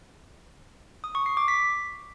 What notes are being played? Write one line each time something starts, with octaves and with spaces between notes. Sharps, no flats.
D#6
C#6
C7
D6
B6